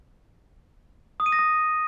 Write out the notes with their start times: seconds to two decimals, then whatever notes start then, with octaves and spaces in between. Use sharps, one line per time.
1.20 D#6
1.26 D#7
1.32 A#6
1.39 D#6